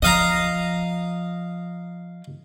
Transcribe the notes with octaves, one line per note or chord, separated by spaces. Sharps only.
F3 D#5 F5 A#5